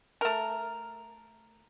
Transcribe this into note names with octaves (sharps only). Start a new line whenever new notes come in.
A3 A#4